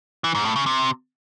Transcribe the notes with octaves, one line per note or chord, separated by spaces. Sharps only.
E3
G#2
A2
C#3
C3